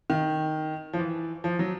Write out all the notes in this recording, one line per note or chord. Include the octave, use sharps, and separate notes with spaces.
D#3
F3
E3
F3
F#3